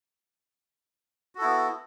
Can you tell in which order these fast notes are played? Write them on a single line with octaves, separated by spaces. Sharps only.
F#4 A4 E4 B3